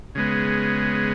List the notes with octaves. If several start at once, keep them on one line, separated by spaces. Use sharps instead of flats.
C#3 G#3 B3